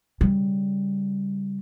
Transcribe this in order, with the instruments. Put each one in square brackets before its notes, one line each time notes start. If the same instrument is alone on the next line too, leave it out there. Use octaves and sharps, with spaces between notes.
[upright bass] C#3 G3